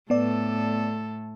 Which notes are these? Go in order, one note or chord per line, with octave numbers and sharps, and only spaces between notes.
A2 B3 A4 D5